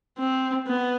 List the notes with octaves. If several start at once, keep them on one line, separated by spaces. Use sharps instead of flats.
C4
B3